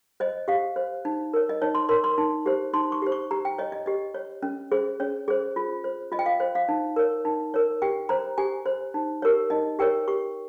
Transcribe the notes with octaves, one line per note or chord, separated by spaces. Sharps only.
C5 D#5
G4 F5
C5
D#4
A#4 C#5
D#5
D#4 C#5
C6
A#4 C#5 C6
C6
D#4
G4 C5
D#4 C6
C#6
G4 C5
C#6
G4 A#5
G5
C#5 D#5
D#5
G4 D#5
C#5
C#4
G#4 C5
C#4 C#5
G#4 C5
F4
C5
F4 D#5
G5
F5
C5
F5
D#4
A#4 C#5
D#4
A#4 C#5
G4 G5
C5 A#5
G4 G#5
C5
D#4
G4 A#4 C#5
D#4 D#5
G4 A#4 C#5 G5
G4 C#6